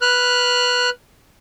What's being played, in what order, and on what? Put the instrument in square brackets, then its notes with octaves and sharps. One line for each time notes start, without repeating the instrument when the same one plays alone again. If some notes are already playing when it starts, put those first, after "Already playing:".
[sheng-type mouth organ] B4 F6 F#6